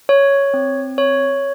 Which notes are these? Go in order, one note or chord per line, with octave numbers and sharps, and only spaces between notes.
C#5
C4
C#5